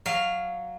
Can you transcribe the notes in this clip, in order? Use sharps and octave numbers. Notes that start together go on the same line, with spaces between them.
F#3 F5